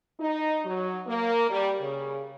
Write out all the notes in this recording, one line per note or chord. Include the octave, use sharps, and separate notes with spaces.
D#4
F#3
A#3
G3
C#3